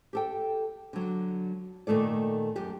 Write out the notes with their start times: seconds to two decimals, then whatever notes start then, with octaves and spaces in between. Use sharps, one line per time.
0.13 G4 A4 G5
0.93 D3 F#3
1.87 A#2 D#3 A3 A4 D5
2.56 F#2 G4